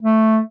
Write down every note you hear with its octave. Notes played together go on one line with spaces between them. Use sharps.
A3